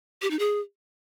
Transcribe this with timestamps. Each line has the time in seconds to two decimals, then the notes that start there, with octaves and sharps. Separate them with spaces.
0.22 G4
0.31 D#4
0.39 G#4